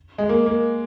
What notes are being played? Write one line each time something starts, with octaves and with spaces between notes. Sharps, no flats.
G#3
A#3
A#3